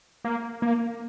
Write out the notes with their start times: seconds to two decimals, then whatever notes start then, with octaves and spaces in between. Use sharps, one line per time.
0.25 A#3
0.62 A#3